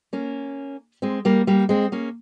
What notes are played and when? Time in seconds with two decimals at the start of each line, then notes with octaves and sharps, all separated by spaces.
0.13 A#3 C#4
1.02 G#3 C4
1.25 G3 A#3
1.47 G3 A#3
1.69 G#3 C4
1.92 A#3 C#4